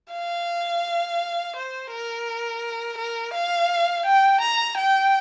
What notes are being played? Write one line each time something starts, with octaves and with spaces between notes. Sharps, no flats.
F5
C5
A#4
A#4
F5
G5
A#5
G5